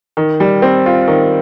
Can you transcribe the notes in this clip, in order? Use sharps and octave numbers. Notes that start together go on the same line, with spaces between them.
D#3
G3
C4
F4
D#3